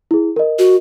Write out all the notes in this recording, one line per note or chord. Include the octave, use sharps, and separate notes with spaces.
E4 G#4
A#4 D#5
F#4